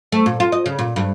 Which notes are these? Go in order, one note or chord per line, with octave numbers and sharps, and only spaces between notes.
A3
A#2
F4
D#5
C#3
A#2
G2